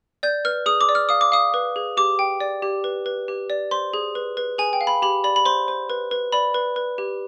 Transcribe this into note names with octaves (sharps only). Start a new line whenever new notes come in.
D5 G6
B4 F6
G#4 D#6
D6
D5
F6
F5 D#6
D6
F5 D#6
B4
G#4
G4 D6
G5
D5
G4
B4
B4
G4
D5
C5 C6
G#4
B4
B4
G#4 G#5
G5
F5
B5
G4 B5
D5 B5
B5
C5 C6
C5
B4
B4
D5 B5
B4
B4
G4